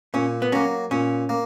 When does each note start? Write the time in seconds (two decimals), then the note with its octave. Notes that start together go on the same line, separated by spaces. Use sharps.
0.14 A#2 C#4
0.42 B3
0.52 F#3 A#3 C#4
0.91 A#2 C#4
1.29 A#3